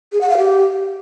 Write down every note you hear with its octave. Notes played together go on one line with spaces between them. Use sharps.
G#4
F#5
F5
G4